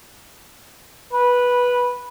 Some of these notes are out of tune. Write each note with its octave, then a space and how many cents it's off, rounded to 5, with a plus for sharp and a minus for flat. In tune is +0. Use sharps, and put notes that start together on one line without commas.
B4 -10